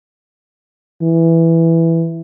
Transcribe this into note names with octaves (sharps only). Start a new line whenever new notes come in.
E3